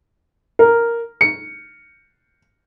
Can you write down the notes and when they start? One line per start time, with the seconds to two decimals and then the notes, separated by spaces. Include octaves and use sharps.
0.59 A#4
1.21 C#7